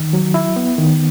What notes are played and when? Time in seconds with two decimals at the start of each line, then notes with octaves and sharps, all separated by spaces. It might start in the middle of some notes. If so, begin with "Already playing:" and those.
Already playing: D#3
0.13 F#3
0.34 E4
0.56 B3
0.78 D#3